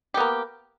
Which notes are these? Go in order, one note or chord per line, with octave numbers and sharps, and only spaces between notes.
A#3 B3 G4